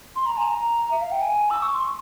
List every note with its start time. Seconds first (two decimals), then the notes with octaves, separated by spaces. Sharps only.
0.16 C6
0.26 A#5
0.37 G#5
0.48 A#5
0.91 E5
1.02 F5
1.12 G5
1.22 G#5
1.50 E6
1.62 C#6
1.74 C6